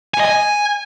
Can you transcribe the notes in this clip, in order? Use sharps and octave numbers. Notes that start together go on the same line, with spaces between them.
G#5
D#5
G#5